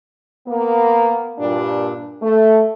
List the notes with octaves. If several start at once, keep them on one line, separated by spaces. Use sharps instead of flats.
A#3 B3
G2 A#2 D4
A3